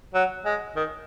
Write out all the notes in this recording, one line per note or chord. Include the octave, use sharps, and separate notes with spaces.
F#3
G#3
D#3